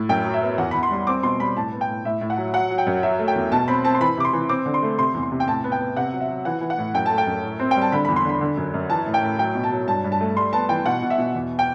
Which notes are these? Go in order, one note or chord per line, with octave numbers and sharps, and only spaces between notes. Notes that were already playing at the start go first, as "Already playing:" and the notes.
Already playing: A2
F#2 G5
F#3
E5
B3
E2 F#5
E2 B5
C6
G3
C4 D6
B2 C6
G3 B5
A2 A5
B3
G5
A2
A2 E5
A2
F#5
F#3
F#3 F#5
F#3
G5
F#2
F#3 E5
A3
G5
E2
B2 A5
C4 B5
C4 A5
C6
E3 B5
C3 D6
C6
E3
C4 D6
D3
C6
A3
C3 C6
E2
C6
C3
G5
A2 A5
B3
G5
B3
C3 F#5
F#3
E5
F#3
E3 F#5
E3
F#5
A2
F#2 G5
A3 A5
G5
F#2
A2
C4
G3 G5
A5
D3 B5
E2 B5
C6
D3 B5
D3
F#2
F#2
E3 A5
A2
G5
A2
F#3 G5
B2
A5
F#3
G2 A5
G2
A5
A3
G3 C6
B3 A5
E3 G5
B2 F#5
B2
E5
B2
E2
G5